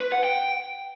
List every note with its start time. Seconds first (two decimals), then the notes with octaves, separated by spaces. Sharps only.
0.01 B4
0.12 F#5
0.24 G5